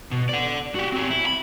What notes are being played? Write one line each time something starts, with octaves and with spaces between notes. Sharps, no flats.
B2
D5 F#5
F#4 G4
C4 G#4
E4
B5